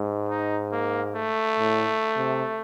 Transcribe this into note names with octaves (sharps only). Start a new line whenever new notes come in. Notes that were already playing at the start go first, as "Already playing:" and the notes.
Already playing: G#2
D#4
A#3
A3
A2
C3